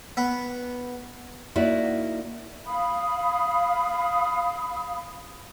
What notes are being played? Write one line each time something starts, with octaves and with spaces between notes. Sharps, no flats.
B3
A#3 D#4 E4 F#4 D5
F5 B5 D#6